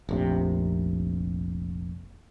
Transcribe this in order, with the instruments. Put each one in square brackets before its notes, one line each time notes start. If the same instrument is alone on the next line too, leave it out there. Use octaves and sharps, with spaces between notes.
[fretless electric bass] F1 A#1 C3